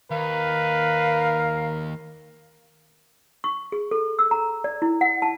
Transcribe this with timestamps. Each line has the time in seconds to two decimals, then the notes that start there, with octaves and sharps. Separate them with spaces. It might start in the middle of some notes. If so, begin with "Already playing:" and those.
0.11 D#2 A#4 B4 F5
3.44 C#6
3.72 G#4
3.91 A4
4.19 E6
4.31 A#5
4.64 D5
4.82 E4
5.01 F#5
5.22 A5